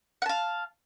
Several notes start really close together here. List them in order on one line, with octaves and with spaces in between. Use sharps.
F#5 A5 F5